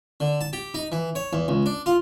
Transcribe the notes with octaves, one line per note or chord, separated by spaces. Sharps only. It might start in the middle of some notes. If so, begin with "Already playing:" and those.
D3
A5
G4
D#4
E3
C#5
E2
C#2
D4
F4